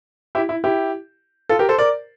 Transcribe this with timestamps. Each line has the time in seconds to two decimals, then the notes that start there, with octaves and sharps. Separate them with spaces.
0.35 E4 G4
0.49 E4
0.64 E4 G4
1.49 F4 A4
1.59 G4 A#4
1.69 A4 C5
1.78 A#4 D5